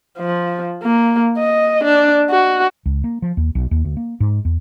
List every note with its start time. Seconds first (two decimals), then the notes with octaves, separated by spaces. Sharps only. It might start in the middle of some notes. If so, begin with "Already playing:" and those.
0.18 F3
0.83 A#3
1.39 D#5
1.84 D4
2.30 F#4
2.86 C#2
3.04 A#3
3.22 F3
3.37 D#2
3.55 B1
3.71 D#2
3.85 D2
3.97 A#3
4.20 G#2
4.45 E2